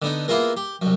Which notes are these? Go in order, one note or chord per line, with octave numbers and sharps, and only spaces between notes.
D3 B3 D#4
A#3 B3 E4 F4 G#4 A#4
G4
C2 F#2